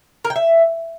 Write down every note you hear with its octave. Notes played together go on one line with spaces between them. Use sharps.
A#4
G5
E5